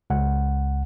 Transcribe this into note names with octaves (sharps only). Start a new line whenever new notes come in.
C#2 F#5